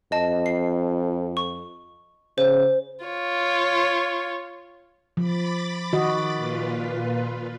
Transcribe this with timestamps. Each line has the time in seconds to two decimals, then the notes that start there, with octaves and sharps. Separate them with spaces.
0.12 F2 D#5 A5
0.46 C7
1.37 C#6
2.38 C#3 C5
3.05 F4 C#5
5.17 F3 B5 D6 A6
5.93 D#3 F#4 D#5
6.36 A#2 F4 B4